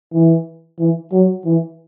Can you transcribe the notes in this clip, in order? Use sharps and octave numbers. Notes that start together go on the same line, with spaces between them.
E3
E3
F#3
E3